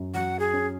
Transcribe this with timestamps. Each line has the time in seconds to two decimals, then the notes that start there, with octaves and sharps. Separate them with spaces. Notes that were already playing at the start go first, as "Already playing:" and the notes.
Already playing: F#2 F#3
0.14 F#3 F#5
0.40 G#4
0.53 C#4